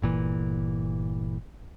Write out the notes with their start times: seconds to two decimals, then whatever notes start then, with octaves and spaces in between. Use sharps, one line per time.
0.02 G1 A#2 E3